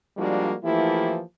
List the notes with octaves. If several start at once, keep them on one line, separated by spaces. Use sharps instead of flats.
F3 G3 G#3 A#3 D4 F#4
E3 F3 A3 A#3 E4 G4